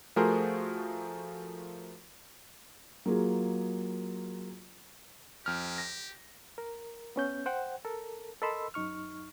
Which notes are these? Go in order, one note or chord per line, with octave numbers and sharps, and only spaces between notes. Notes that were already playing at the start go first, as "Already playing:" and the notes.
F3 A3 F#4 G#4 A#4 C5
F#3 A#3 F4 G#4
F2 G4 F6
A#6
A#4
B3 C#4 G6
C5 F#5 G5
A4 A#4
A4 A#4 D#5 B5 C6 E6
F#2 D#4 C#6 F6